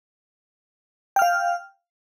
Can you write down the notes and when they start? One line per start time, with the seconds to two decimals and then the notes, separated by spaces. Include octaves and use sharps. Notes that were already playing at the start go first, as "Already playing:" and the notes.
1.16 G5
1.19 F6
1.22 F5